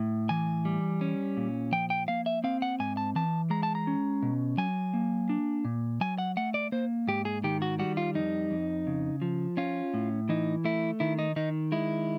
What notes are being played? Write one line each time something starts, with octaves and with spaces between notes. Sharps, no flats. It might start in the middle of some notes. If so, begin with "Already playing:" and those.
Already playing: A2
E3 G#5
G3
C#4
A#2
F3 G5
G5
A#3 F5
E5
C4 F5
F#5
G#2 G#5
A5
E3 A5
G#3 A#5
A5
A#5
C#4
B2
F#3 G#5
A#3
D4
A#2
F#3 G#5
F#5
A3 F#5
D5
A#3 C5
G#2 G4
G#4
D#3 G4
F#4
G3 F#4
F4
F2 D#4
F2
C#3
F3
C#4 F4
A2
E3 D#4
A3 E4
D#3 E4
D#4
D#3 D#4
G#3 E4